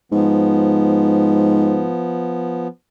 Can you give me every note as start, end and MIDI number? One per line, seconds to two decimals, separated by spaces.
0.12 1.88 44
0.12 2.68 53
0.12 2.68 59